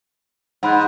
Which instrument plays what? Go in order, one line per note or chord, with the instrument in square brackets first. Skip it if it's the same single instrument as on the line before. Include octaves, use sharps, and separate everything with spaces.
[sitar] G#2 [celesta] F#5 B5 F#6